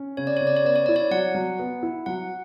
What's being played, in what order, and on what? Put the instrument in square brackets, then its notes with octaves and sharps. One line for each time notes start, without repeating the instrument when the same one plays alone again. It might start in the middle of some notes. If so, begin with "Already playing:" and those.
Already playing: [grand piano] C#4
[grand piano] C#3 [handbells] C#5
[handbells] D5
[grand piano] C#3 [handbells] C#5
[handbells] D5
C#5
[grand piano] B3 [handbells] D5
[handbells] C#5
[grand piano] E4 [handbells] D5
[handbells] C#5
[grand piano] F#3 [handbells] F#5
[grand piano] F#3
B3
E4
[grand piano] F#3 [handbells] F#5